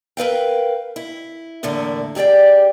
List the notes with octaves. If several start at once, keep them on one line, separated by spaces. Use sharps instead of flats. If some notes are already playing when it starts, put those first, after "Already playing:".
A#4 B4 F5 G5
E4
E2 A2 D3 A#3 E4
G2 G4 G#4 D5 G5